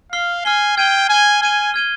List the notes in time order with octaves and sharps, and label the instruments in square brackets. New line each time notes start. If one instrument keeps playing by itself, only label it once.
[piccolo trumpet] F5 [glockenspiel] F6 C7 G7
[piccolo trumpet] G#5 [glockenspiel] F6 C7 G7
[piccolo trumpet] G5 [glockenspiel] F6 G#6 D#7 G7
[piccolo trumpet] G#5 [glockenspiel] F6 G#6 D#7 G7
[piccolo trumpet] G#5 [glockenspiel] F6 G#6 D#7 G7
[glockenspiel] F6 G#6 D#7 G7